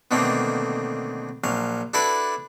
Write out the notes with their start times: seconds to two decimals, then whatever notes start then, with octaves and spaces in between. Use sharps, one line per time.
0.11 B2 D3 D#3 A3 A#3 C4
1.44 A#1 F#3 F5
1.94 D4 E4 F#4 A4 B4 D5